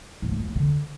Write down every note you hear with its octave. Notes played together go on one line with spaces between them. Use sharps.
G#2
A3
F2
F#3
D3